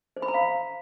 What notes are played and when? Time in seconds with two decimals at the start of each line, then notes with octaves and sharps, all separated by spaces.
0.17 C5
0.22 B5
0.28 A#5
0.34 F5